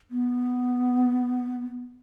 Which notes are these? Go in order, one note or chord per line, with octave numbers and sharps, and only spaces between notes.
B3